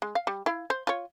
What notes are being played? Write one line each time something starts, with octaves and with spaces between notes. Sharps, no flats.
G#3
F5
G3
E4 F5
C5
F4 C#5